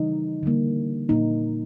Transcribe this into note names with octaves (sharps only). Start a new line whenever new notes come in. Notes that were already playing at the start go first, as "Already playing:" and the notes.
Already playing: C#3 E3 G3 D#4
D3 G3 A#3
A#2 F3 A#3 D#4